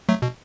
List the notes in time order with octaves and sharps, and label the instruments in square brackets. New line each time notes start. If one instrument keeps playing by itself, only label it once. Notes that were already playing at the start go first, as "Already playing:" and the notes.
[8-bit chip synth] F#3 A3
B2